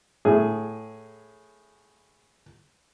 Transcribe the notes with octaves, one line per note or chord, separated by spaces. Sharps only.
A2 G#4